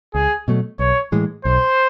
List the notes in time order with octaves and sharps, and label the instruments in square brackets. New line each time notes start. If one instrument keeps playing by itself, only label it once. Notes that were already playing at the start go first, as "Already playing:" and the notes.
[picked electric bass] C#2 [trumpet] G#4
[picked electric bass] B2 F#3 A3
[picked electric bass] B1 [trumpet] C#5
[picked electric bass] A2 E3 G#3
[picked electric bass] B1 [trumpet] C5